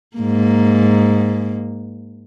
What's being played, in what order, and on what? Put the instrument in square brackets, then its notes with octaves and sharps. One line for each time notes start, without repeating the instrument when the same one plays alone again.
[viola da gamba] G#2 A#3